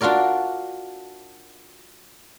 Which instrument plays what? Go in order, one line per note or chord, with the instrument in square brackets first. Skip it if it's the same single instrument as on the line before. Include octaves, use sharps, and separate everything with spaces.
[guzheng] D4 F4 F#4 A#4 D5